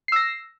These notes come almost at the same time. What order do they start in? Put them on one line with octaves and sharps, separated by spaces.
C7 E6 A#6